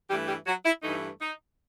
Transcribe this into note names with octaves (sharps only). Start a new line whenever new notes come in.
G2 E3 G3 A3 G4
G3 G4
F#3 F#4
E4
G2 E3 A3 D#4
D#4